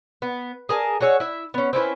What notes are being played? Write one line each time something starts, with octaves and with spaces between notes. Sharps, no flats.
B3
G#4 A#4 G#5 A5
F#4 G#4 C#5 E5
E4 E5
B3 C#4
C4 C#4 E4 B4